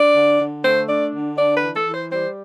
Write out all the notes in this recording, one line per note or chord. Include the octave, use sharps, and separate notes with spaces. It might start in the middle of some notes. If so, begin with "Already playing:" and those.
Already playing: D4 D5
D3
D3
A3 C5
D4 D5
D3
D4 D5
B4
E3
A4
E3
C5
G3 C5